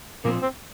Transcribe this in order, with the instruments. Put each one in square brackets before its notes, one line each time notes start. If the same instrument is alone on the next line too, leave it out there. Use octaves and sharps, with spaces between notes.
[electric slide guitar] A#2 F3 C4 [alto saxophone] A#3
[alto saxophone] C4